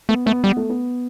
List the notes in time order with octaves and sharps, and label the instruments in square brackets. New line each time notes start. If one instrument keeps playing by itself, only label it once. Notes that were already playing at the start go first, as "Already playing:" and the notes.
[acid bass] A3 [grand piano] B3
[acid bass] A3 [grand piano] B3
[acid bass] G3 [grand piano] B3
[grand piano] A3
B3